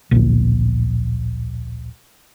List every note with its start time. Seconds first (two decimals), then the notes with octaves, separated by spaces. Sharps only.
0.11 D1 A#1